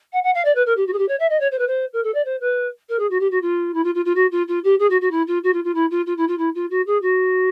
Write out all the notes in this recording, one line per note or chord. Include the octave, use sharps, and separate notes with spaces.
F#5
F#5
F5
D5
B4
A#4
G4
F#4
G#4
G4
C#5
E5
D#5
C#5
C5
B4
C5
A#4
A4
D5
C5
B4
A#4
G#4
F#4
G4
F#4
F4
E4
F4
F4
F4
F#4
F4
F4
G4
G#4
F#4
F#4
E4
F4
F#4
F4
F4
E4
F4
F4
E4
F4
E4
F4
F#4
G#4
F#4